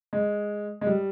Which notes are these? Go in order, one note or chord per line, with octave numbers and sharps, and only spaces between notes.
G#3
G#3
G3